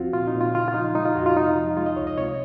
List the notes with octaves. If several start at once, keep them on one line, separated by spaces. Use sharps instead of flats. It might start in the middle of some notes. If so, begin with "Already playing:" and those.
Already playing: D#2 F3 C4 F4 F#4
A#2 F4
D#4
A#2
F4
C#3 F4
F4
F3 D#4
G#3 D#4
F4
F2 F#4
F4
C3 D#4
F3 F4
G#3 F4
D#5
C#2 C#5
D#5
C3 C#5